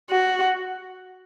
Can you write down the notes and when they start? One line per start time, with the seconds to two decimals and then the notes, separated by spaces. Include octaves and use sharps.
0.10 F#4